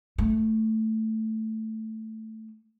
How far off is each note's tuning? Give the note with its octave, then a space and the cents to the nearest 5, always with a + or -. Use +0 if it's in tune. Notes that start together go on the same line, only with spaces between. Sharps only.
A3 +5